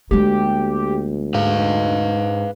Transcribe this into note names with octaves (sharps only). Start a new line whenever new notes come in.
D2 G#3 A#3 G4
G#2 B4 F5